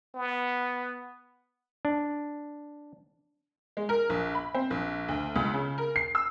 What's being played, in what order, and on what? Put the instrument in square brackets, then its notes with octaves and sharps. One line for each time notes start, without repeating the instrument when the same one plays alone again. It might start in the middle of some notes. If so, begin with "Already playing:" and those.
[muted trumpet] B3
[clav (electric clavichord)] D4
[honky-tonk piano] G#3
A#4
A#1
B5
C4
A#1
D2
C#2
C#3
A#4
C7
E6